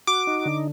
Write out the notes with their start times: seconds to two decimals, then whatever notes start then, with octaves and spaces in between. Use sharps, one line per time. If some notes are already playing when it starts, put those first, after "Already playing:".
0.07 F#4 D6
0.27 D#4
0.46 D3